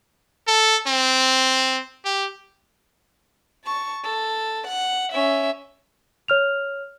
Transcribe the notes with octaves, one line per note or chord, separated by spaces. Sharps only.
A4
C4
G4
A5 C#6
A4
F#5
C#4 E5
C#5 F6 F7